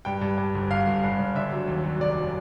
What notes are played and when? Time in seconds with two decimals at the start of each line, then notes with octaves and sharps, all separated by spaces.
0.05 G2 G5
0.21 G2
0.38 G2
0.55 G1
0.71 G1 F5
0.87 G1
1.04 G2
1.19 G1
1.35 D3 E5
1.52 F#3
1.67 D#2
1.84 F#3
2.00 F1 D5
2.17 F#3